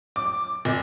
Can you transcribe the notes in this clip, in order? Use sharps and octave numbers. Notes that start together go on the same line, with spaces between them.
D6
F1